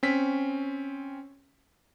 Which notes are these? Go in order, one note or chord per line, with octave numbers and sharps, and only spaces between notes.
C4 C#4 B6